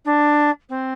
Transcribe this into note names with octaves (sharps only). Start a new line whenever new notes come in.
D4
C4